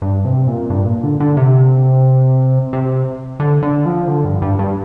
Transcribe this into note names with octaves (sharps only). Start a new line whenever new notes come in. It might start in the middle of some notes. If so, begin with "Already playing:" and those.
G2
C3
A#2
G2
A#2
D3
D3
C3
C3
D3
D3
F3
D3
G2
G2
G2